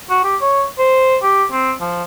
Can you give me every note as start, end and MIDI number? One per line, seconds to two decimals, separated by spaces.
0.10 0.20 66
0.24 0.36 67
0.41 0.64 73
0.78 1.17 72
1.22 1.44 67
1.52 1.72 60
1.81 2.03 53